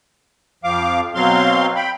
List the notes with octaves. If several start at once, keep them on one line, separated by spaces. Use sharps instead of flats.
F2 F3 F5 D6
B2 F#3 C4 F5 C6
G5 B5